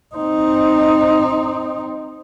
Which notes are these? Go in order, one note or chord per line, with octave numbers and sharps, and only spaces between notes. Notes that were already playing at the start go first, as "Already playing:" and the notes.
C4 D#4